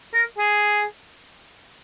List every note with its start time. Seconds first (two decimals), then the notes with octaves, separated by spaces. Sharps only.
0.14 A#4
0.38 G#4